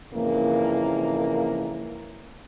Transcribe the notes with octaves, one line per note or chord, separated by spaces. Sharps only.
F2 G#2 C#3 E3 A#3